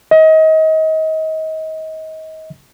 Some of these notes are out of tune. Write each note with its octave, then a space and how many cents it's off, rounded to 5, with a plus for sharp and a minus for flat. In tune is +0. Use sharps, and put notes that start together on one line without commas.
D#5 +30